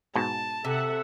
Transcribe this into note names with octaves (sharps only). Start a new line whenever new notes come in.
G#2 B2 A5
C3 A4 E5 F#5